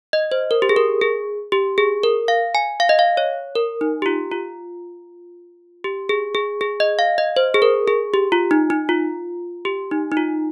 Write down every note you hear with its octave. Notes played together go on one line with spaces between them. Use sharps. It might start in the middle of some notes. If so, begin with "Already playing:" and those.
D#5
C5
A#4
G4
G#4
A#4
G#4
G4
G#4
A#4
F5
G#5
F5
D#5
F5
C#5
A#4
D#4
G4
F4
F4
G4
G#4
G#4
G#4
D#5
F5
D#5
C5
G#4
A#4
G#4
G4
F4
D#4
D#4
F4
G4
D#4
D#4
F4